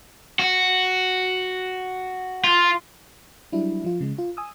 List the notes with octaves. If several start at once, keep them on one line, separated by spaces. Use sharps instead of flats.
F#4
F4
F#3 G3 D4 E4
F3 F4
C#3 G#3
F4
G#5 D#6 E6